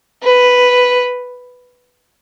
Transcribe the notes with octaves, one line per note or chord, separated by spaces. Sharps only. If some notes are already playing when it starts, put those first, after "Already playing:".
B4